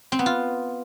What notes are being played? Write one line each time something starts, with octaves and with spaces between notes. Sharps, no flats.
C4
B3
F4